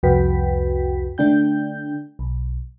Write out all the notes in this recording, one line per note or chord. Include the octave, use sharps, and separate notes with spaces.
C2 F2 F#4 B4 G5 B6
D3 A3 D4 G5 G6
B1